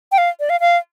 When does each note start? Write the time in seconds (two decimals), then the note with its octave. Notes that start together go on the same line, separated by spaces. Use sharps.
0.12 G5
0.18 F5
0.40 D5
0.50 F5
0.60 F5